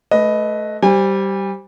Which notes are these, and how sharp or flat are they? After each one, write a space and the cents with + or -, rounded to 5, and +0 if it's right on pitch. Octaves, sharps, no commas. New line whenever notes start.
A3 -20 B4 +0 D#5 +0
G3 -10 C5 +0 G#5 -45